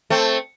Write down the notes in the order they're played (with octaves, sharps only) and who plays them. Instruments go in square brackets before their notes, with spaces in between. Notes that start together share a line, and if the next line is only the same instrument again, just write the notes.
[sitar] A3 C4